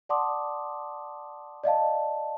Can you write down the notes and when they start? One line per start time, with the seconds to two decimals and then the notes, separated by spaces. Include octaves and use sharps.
0.09 D5 F#5 A5 C6 D6 D#6
1.64 D5 D#5 F5 A5